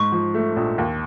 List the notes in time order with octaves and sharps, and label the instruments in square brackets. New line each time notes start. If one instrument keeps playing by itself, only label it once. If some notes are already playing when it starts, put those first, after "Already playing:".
Already playing: [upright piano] G#2 [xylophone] C#6
[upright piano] F3
A3
A#1
D#2